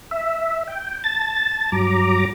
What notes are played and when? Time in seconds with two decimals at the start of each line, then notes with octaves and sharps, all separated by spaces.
0.11 E5
0.68 G5
1.04 A5 A6
1.72 G2 F#3 A#5 D6